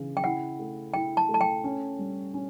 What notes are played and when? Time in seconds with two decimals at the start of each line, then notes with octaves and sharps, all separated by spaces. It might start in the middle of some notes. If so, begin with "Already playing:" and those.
Already playing: C#3 E3
0.17 G5
0.24 E4 F#5
0.59 A3
0.94 E4 G5
1.17 A5
1.29 A3
1.34 A5
1.41 G5
1.64 C#4
1.99 G3
2.34 C#4